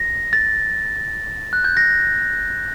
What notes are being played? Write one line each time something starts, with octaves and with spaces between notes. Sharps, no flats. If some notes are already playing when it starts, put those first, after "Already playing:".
Already playing: A#6
A6
F#6
G6
A#6